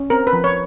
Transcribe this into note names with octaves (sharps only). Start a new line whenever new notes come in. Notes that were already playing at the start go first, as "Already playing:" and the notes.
Already playing: C#4
C4 A#4
B4
F3
C#5